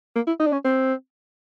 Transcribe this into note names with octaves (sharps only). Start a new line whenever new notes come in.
A#3
E4
D#4
D4
C#4
C4